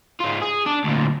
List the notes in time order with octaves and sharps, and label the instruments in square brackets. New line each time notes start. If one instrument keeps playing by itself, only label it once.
[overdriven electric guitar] G#2 F4
G#4
D4
D2 A#2